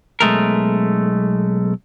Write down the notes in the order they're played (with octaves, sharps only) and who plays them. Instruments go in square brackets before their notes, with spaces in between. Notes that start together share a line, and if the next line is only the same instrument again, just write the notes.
[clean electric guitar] B1 G#3 A3 A#4